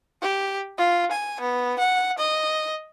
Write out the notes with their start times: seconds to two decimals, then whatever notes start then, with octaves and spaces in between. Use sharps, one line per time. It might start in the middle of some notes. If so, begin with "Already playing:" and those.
0.22 G4
0.78 F4
1.11 G#5
1.41 B3
1.79 F#5
2.18 D#5